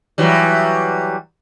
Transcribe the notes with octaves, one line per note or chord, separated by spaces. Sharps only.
E3 F#3 G3